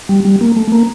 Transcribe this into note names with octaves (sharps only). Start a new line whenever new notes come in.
G3
G3
A#3
A3
A#3